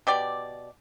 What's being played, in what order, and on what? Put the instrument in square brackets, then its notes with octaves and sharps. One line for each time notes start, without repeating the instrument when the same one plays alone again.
[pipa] B2 G4 D5